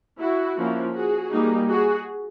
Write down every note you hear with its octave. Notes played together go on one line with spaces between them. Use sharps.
E4 F#4
F3 A#3 C#4 E4
F#4 G#4
G3 A#3 D#4
F#4 G#4